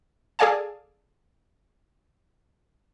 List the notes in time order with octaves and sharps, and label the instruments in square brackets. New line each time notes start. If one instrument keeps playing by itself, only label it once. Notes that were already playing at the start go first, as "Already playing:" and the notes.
[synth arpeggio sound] G#4 A4 D5 F5 G#5 A5